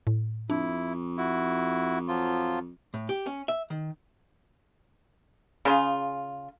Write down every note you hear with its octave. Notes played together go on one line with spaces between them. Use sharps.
A2
F2 D4 E4
E4 F#4
F3 F#3 F4
A2
G4
C#4
E5
D#3
C#3 F4 G#4